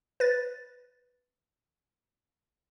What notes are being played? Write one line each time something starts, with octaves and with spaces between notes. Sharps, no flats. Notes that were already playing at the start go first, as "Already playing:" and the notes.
B4 A6